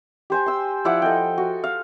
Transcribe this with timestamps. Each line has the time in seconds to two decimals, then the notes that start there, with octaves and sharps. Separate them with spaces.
0.30 G4 C5 G#5
0.46 C6 E6
0.85 F3 E4 D5 F#5
1.02 A4 D#5 G5
1.38 F#4
1.64 F5